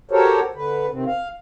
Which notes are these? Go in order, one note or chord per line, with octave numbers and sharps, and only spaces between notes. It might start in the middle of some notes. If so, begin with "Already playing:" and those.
F#4 G4 A4 A#4 C5 C#5
D3 B4
C3 D#3 C4
F5